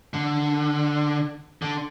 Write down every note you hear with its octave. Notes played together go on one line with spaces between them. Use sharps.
D3
D3